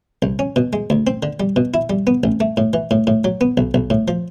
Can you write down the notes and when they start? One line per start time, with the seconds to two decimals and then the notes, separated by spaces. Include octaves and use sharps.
0.22 C2
0.39 C#4
0.56 B2
0.73 G#3
0.90 D2
1.07 C4
1.23 D3
1.40 G3
1.56 B2
1.74 E4
1.90 G3
2.07 B3
2.24 A1
2.40 A3
2.57 A2
2.73 E3
2.91 A2
3.07 A2
3.24 F#3
3.41 B3
3.57 B1
3.74 B1
3.90 A2
4.08 F3